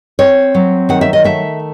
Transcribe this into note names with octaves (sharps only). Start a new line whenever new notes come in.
C4 C#5
F#3
D#3 F#5
E5
D#5
A3 E5